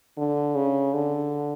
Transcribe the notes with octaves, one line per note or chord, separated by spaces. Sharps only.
D3
C#3
D3